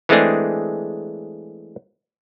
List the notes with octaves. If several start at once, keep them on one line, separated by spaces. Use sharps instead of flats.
E3 G#3 A3 C4 D4 G#4